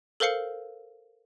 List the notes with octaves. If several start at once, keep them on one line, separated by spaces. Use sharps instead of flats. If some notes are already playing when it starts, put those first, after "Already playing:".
A4 A#4 C5 F5 C7 C#7